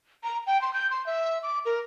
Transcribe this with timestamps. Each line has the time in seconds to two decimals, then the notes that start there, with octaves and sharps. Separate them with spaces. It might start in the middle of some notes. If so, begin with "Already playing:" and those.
0.24 A#5
0.47 G5
0.62 C6
0.74 G6
0.90 C6
1.06 E5
1.43 D6
1.65 A#4